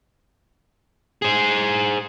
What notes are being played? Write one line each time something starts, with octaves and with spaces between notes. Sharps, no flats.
G#4 C5